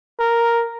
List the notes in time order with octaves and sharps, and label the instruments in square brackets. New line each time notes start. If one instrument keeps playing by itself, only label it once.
[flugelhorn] A#4